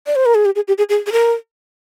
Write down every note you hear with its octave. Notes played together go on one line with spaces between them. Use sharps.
D5
C5
A#4
G#4
G4
G#4
G4
G#4
G#4
G#4
A#4